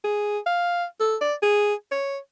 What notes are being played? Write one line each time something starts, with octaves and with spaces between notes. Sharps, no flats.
G#4
F5
A4
D5
G#4
C#5